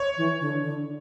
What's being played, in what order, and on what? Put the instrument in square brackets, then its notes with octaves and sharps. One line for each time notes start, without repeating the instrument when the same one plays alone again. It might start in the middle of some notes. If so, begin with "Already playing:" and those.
Already playing: [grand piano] C#5
[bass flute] E3
D3
D3